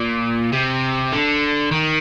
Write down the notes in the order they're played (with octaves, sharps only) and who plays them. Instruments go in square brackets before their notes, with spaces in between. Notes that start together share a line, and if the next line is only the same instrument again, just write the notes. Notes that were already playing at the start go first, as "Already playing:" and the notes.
Already playing: [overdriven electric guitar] A#2
C3
D3
D#3